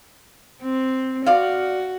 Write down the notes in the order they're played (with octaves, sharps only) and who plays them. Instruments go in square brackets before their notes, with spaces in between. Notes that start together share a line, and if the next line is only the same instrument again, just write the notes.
[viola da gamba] C4
[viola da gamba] F#4 [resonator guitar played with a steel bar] D5 F5